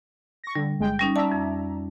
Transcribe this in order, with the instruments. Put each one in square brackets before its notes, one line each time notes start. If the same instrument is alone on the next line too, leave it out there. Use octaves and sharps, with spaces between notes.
[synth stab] C#6 A#6
[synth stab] D3 [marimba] G3
[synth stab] G1 G#3 G5
[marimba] G3 C#4 D#4
[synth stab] D5 E5 A#5 [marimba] A5
[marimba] F2